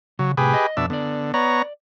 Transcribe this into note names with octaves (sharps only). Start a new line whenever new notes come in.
C#3 F#3
A2 C3 G4 G#4 B4
D#5
F2 B2 D4 E5
D3 B3 D5
B3 C#5 D5 A#5